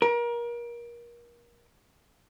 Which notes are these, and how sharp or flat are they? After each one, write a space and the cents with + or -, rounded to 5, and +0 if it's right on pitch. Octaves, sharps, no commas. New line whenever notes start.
A#4 +30